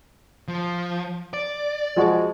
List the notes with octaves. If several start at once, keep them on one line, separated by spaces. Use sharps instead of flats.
F3
D5
F3 G#3 F#4